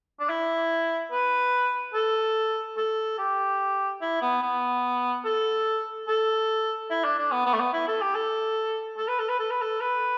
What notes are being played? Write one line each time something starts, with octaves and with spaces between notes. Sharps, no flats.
D4
E4
B4
A4
A4
G4
E4
B3
B3
A4
A4
E4
D4
D4
B3
B3
A3
B3
E4
A4
G4
A4
A4
B4
A4
B4
A4
B4
A4
B4